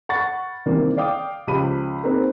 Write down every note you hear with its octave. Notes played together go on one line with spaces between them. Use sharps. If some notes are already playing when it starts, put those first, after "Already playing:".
F#5 B5 C#6 A6
C3 D#3 E3 G3 A#3 C4
D5 F5 G5 D6 D#6
C#2 F3 G4 B5 D#7
A#3 C4 D#4 G#4 B4 C5